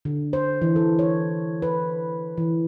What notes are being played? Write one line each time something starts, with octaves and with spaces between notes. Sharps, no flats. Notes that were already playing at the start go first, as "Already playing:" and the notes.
D3
C5
E3
A4
C#5
B4
E3